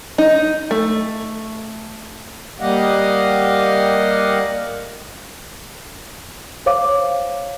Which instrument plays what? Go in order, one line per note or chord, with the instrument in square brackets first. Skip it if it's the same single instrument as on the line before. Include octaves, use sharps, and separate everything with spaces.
[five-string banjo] D#4
A3
[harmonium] G3 A#3 G4 D#5 F5 F#5
[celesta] C5 C#5 F5 D6